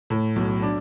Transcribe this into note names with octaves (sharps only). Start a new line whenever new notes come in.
A2
B1
D4